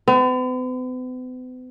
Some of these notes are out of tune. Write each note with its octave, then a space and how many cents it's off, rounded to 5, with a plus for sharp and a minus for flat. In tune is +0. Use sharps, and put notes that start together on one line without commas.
B3 +45